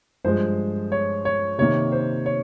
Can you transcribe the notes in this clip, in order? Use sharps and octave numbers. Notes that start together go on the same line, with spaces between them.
G2 F3 G#3 C5
C#5
C#5
C3 D#3 A#3 C#5
C5
C#5